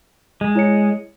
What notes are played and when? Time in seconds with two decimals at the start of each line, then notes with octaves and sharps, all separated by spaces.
0.41 G#3
0.55 E4 C#5 C#7